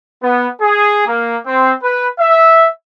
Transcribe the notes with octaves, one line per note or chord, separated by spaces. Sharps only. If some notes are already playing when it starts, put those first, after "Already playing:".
B3
G#4
A#3
C4
B4
E5